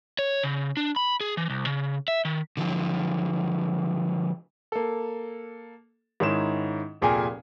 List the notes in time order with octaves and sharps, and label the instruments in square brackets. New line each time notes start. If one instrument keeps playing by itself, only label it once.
[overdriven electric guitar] C#5
C#3
D4
B5
G#4
E3
C2
C#3
E5
D#3
[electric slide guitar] D3 F3 F#3
[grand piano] A#3 A4
G#2 D#3 C#4 E4 E7
F1 A#2 G#4 A#4 G5 G#5